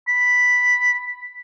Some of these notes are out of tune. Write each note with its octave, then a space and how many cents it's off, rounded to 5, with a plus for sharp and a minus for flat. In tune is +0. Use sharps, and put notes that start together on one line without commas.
B5 +0